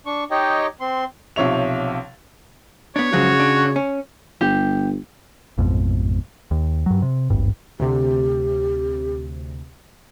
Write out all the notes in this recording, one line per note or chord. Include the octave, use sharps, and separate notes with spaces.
D4 C#6
D#4 G4 C#5 D#5 G5
C4 C6
B1 C3 F3 C#5 E5 F7
B3 D4 C#5
C#3 F3 F#3 G#3 F#4
D4
C#4
G1 G4
A1 F2 G#2 B2
D#2
G2 F#3
C3
D1 G#1 G2
D2 C3 G4